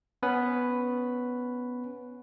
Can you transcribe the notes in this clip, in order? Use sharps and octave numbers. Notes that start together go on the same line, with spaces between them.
B3 C#4 B4